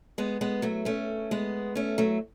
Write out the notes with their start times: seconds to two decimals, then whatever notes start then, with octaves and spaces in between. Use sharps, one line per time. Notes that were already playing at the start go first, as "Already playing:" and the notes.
0.18 G#3 B3
0.41 G#3 B3
0.62 F#3 A3
0.85 A3 C#4
1.31 G#3 B3
1.75 A3 C#4
1.98 F#3 A3